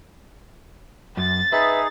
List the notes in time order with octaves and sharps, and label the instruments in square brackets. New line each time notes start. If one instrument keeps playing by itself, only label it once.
[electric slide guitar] F#2 [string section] A6
[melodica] D#4 G#4 [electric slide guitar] B4 [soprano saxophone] E5